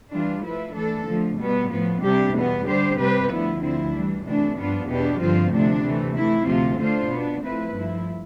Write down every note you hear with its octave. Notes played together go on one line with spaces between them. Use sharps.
E3 G3 D4 F4
F3 A3 E4 B4
E3 A3 D4 A4
D3 F3 A3
B2 G3 B3
A2 F3 B3
C3 G3 D4 G4
E2 B2 G3 B3
D3 G3 D4 G4 C5
C3 G3 C4 G4 B4
D2 D3 F3 B3 E4
D2 D3 F3 C4 E4
E3 G3 D4
D2 C3 E3 A3 D4
G2 F3 B3 D4 F4
E2 B2 B3 D4 G4
G2 D3 F3 C4 F4
D2 C3 F3 A3 D4
C3 E3 A3
E3 A3 E4
D2 C3 F3 C4 F4
D3 A3 D4 F4 C5
B2 B3 D4
F3 A3 C4 E4 B4
G2 F3 A3 E4